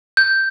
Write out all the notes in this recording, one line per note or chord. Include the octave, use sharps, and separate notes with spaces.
G6